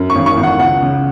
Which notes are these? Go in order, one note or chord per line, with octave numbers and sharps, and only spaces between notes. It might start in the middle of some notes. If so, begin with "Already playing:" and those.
Already playing: F#2
C#6
G#1
C#6
G#1
F#5
C#2 F#5
C#3